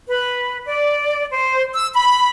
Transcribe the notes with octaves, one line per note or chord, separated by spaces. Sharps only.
B4
D5
C5
E6
B5